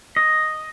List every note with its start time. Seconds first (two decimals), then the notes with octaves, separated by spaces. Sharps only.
0.16 D#5